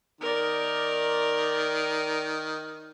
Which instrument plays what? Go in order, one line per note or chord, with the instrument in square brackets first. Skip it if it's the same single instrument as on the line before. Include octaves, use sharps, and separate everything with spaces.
[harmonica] D#3 [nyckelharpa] A#4 D5